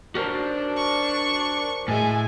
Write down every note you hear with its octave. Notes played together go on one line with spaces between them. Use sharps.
D4 F#4 A#4 C5
C#6
A2 G#3 A4 E5 G#5